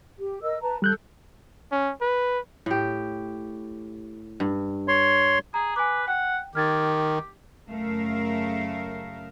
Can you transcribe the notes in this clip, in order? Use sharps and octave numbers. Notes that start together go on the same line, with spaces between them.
G4
A#4 D#5 E6
B4 A5 A#5
G3 A4 F#6 G6
C#4
B4
A2 G4
G2
C#5 C6
G#4 A#5
B4 G#5 D6
F#5 G5
D#3 G4 F6 G#6 A6
F#2 C#3 A3 A#4 E5 F5